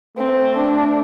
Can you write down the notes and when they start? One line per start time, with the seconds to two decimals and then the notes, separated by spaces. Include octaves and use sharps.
0.17 A3 C4
0.57 D4